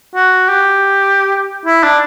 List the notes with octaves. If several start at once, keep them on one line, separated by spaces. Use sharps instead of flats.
F#4
G4
E4
D4